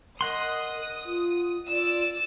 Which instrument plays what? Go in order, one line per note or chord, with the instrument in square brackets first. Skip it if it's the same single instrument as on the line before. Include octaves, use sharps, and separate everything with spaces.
[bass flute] A#4 [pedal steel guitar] D#5 F#5 C6 [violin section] D#6
[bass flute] F4
[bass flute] F4 [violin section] D5 E6